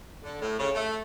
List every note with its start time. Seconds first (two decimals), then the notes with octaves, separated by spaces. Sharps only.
0.23 D3
0.42 A2
0.59 C#3
0.75 A3